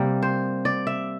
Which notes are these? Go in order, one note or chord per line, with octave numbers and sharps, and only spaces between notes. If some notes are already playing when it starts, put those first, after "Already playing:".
Already playing: C3 G3 A#3 A#4
C5
D5
E5